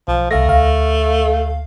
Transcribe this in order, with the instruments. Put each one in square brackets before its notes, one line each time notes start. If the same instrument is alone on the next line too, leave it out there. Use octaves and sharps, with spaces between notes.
[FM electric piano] B1 [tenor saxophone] F3
[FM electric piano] C2 F5 A#6 [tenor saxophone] A3
[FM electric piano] D2 F5